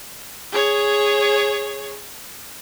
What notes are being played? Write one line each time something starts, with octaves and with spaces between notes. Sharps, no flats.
G#4 C#5